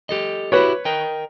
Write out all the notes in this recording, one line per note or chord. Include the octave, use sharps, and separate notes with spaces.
G4 A4 D#5
E4 F#4 G4 B4 C#5
A#4 D#5 G5